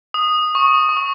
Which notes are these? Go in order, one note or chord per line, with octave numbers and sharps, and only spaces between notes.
D#6
C#6
C#6
D#6